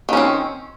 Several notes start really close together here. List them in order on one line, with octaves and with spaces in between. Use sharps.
D#3 C#4 C4